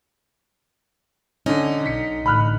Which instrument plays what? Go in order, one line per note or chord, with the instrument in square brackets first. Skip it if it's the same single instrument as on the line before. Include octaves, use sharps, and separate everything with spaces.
[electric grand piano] D3 C#4 [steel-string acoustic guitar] D#4
[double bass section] B1 [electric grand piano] B6 C#7
[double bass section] A1 D3 [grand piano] B5 F6 F#6